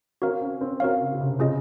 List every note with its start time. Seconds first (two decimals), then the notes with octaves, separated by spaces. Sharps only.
0.22 C4 F#4 A#4 C#5 F5
0.41 C#4
0.61 C4
0.80 C4 F#4 A#4 C#5 F5
1.00 C#3
1.12 C#3
1.20 C3
1.39 C#3 C#4 F4 G#4 D#5